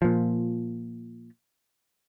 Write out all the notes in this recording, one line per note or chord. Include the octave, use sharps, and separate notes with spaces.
A#2 F3